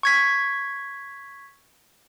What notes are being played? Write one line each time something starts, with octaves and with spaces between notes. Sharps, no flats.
C#6 G#6 B6